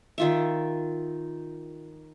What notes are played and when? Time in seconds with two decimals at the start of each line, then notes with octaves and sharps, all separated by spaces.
0.18 D#3 F4 E5